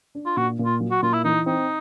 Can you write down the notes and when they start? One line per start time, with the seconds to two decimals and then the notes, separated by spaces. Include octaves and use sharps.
0.15 D4
0.26 F4
0.37 A#2 F#4
0.59 A#2
0.65 F4
0.80 F#3
0.91 F#4
1.02 A#2 F4
1.13 E4
1.25 E3 D#4
1.46 C4 D#4